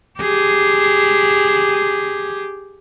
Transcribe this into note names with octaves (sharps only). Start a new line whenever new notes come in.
G4 G#4